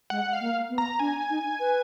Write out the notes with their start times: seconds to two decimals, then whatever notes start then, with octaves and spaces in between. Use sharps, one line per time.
0.10 G#3 F#5
0.33 F5
0.40 A#3
0.69 B3
0.78 A#5
1.00 D4 G#5
1.30 D#4
1.60 B4